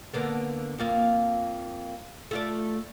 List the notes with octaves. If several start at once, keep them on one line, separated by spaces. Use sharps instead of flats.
D3 A#3 B3
F2 A#3 F4
A3 F4 D5